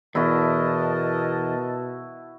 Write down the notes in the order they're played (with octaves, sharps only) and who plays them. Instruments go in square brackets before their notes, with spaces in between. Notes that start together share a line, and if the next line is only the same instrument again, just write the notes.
[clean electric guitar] E2 [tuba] B2 [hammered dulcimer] E4 F#4 [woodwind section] A#4 D#5 A5